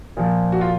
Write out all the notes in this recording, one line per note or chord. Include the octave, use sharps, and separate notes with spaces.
A#2 F3
F#4
F4